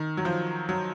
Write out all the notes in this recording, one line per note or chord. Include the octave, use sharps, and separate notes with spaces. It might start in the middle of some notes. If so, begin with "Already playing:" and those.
Already playing: D#3
F#3
F3
F#3